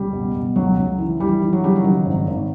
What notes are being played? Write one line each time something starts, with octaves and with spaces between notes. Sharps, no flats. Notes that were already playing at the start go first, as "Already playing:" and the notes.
Already playing: C#2 G3
B2
B2
C#2 F#3
C#2
E3
E3 G3
E3
F#3
C#3 G3
F#3
D#3
G#1
G#1